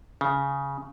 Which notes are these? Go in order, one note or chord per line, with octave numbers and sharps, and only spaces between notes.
C#3